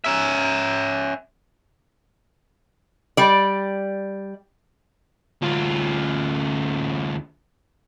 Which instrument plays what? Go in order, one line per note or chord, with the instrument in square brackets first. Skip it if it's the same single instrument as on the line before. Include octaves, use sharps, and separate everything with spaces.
[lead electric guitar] C#4 E5
[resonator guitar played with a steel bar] G3 D5
[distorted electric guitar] D2 F4